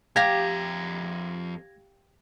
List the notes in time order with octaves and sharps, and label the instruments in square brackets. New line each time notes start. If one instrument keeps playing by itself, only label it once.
[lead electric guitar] F2 A#5 [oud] G4 F5 [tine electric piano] G#6 A#6